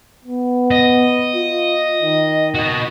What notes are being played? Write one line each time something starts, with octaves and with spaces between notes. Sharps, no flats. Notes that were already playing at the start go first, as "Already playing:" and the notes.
B3
D#5
F4
D#3
F#4 D#5